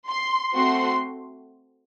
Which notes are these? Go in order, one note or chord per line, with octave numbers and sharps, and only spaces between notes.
C6
A3 C4 F#4 C6